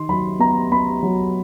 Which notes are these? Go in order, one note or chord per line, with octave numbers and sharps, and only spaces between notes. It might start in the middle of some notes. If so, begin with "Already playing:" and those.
Already playing: D#3 C6
F#3 B5
B3 A#5
B3 B5
F#3